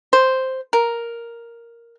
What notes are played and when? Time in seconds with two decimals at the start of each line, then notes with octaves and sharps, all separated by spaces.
0.13 C5
0.73 A#4